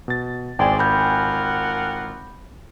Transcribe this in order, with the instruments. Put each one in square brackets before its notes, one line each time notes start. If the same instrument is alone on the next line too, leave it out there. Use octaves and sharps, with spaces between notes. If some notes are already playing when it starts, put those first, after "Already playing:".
[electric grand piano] B2 A6
[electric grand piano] G#1 G#5 [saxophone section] G#3 C5 D5 [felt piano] G5
[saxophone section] F4 A#4 F#5 [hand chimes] B5 G6